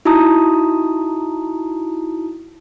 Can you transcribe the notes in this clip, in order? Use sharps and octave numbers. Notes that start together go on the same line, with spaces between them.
D#4 E4 F#4 A5 A#5 D#6